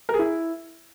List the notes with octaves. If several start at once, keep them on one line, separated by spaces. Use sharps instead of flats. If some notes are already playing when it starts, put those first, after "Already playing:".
A#4
G#4
E4